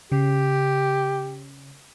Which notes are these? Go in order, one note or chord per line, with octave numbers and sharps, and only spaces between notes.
C#3 G4